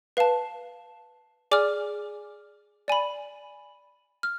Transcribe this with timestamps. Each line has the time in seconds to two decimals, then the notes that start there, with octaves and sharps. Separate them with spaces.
0.17 B4 F5 A5
1.51 G#4 D5 G#5 D6 F6
2.88 D5 G#5 B5
4.23 F6